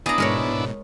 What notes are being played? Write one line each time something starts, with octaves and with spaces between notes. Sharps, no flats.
B3 D4 E4 G#4 A#5 A6
G#2 B2 G#3 A#4 C#5